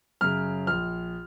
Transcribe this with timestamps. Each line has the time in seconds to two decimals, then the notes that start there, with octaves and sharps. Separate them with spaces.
0.21 F#2 C#3 F6
0.67 A#1 F6